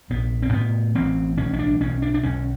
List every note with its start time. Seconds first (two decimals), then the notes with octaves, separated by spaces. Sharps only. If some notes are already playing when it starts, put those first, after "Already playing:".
0.10 A#1 B3
0.42 C4
0.53 A2 B3
0.95 A1 C4
1.38 B1 C#4
1.53 C#4
1.59 D4
1.80 B1 C#4
2.02 D4
2.14 D4
2.23 B1 C#4